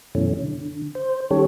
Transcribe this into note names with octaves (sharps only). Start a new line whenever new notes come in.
F#2 B2 E3 A3 C#4
D3
C5
D#3 G3 C#4 G4 A4 C#5